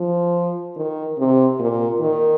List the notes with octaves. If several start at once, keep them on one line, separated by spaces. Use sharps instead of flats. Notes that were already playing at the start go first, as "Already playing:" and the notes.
Already playing: F3
D#3
C3
A#2
D#3